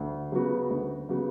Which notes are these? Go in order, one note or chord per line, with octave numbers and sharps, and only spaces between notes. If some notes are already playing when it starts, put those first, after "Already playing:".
Already playing: D2
C#3 F#3 B3 F#4
D2
C#3 F#3 B3 F#4